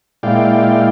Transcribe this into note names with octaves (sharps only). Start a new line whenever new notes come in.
A#2 G#3 E4 D5 F5 G5